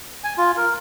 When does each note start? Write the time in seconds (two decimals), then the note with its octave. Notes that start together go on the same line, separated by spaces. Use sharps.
0.24 G#5
0.38 F4
0.57 A#4